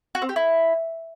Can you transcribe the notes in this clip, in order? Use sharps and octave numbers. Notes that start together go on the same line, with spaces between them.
F#4
C4
G4
E4